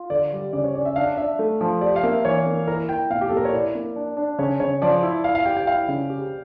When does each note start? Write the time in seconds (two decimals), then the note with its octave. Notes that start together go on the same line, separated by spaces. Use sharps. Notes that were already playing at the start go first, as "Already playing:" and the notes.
Already playing: F4
0.10 D3 D5
0.32 G3
0.53 C#3 D5
0.64 C#5
0.75 C#4 D5
0.85 E5
0.96 D4 F5
1.17 D4 E5
1.39 A3
1.61 F3
1.81 G4 D5
1.96 F5
2.03 A#3 E5
2.25 E3 C#5
2.46 A#3
2.67 E4 A#4
2.89 E4 G5
3.10 A#2 F5
3.21 G4
3.29 A#2 A4
3.37 A#4
3.45 C#5
3.53 E4 D5
3.75 A#3
3.96 D4
4.17 D4
4.38 C#3 C#5
4.60 C#3 C#5
4.82 F3 D5
5.03 E4
5.24 E4 F5
5.35 F5
5.46 G4 G5
5.57 G5
5.67 E4 F5
5.88 C#3
6.10 G4